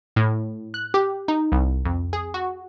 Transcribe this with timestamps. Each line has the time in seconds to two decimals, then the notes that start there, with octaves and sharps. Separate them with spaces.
0.16 A2
0.74 F#6
0.94 G4
1.28 D#4
1.52 C2
1.85 F2
2.13 G#4
2.34 F#4